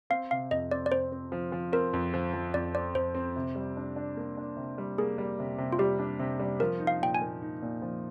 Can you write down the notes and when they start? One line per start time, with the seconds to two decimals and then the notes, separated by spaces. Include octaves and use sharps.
0.10 C4 F5
0.31 C3 F5
0.51 F2 D#5
0.71 C4 D5
0.86 D5
0.91 C4 C5
1.12 C4
1.32 F3
1.52 F3
1.73 C4 A#4
1.93 F2
2.14 F3
2.33 F3
2.54 F2 D5
2.74 C4 D5
2.95 F2 C5
3.15 C4
3.36 C3
3.55 G3
3.77 D4
3.96 D4
4.17 A#3
4.37 D4
4.57 C3
4.78 G3
4.98 A#3 G#4
5.18 G3
5.39 C3
5.58 C3
5.72 F4
5.79 G3 G4
5.99 D4
6.19 C3
6.40 G3
6.60 F3 A#4
6.80 D#4
6.87 F5
7.02 A#2 G5
7.14 G#5
7.21 A#3
7.42 D#4
7.62 A#2
7.82 F3